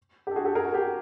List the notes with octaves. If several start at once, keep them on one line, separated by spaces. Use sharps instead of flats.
G4
A4
F#4 G#4
G4 A4
G#4 A#4
F#4
G4